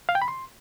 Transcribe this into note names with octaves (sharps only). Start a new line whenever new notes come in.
F5
G5
B5
C6